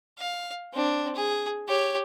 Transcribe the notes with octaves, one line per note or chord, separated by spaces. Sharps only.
F5
C4 D4
G#4
G4 C#5